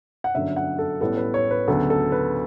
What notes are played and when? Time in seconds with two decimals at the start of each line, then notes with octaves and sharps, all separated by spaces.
0.24 F#5
0.34 G1 F#2 D3 F#3 E5
0.56 F#5
0.79 A4
1.01 A1 A2 G3 B3 A4
1.17 B4
1.34 C#5
1.51 B4
1.68 D2 C#3 F#3 B3 A4
1.90 A4
2.12 B4